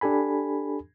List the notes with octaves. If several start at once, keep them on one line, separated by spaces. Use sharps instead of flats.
D4 G4 A4 G#5 B5